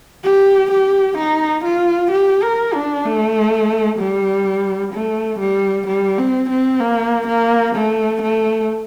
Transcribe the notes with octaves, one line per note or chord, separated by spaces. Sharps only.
G4
G4
D#4
F4
G4
A#4
D4
A3
G3
A3
G3
G3
C4
C4
A#3
A#3
A3
A3